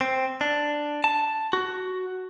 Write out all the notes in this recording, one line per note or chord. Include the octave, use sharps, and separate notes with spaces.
C4
D4
A5
F#4